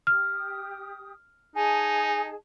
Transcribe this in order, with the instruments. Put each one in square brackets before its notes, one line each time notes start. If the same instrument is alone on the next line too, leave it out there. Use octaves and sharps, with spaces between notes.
[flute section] G4 D#6 [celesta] F6
[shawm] D#4 [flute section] G#4 D#5 A5 [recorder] G#5